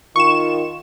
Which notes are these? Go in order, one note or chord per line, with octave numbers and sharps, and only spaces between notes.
D#3 F4 C#6 E7